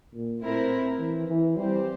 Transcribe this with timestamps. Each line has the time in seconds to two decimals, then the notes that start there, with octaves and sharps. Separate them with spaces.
0.14 A#2
0.42 A2 C4 E4 A#4
0.99 E3
1.28 E3
1.56 G3 C4 G4 C5